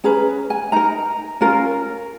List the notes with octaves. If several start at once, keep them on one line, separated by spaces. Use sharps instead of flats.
C#4 G#4 B4 A#5
G#5
D#4 A#4 A#5
C#4 F4 A#4